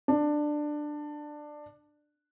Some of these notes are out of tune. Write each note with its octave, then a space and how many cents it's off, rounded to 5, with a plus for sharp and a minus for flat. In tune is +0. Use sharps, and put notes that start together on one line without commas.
D4 +15